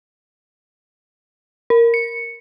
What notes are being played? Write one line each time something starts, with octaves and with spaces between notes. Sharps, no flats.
A#4
C#7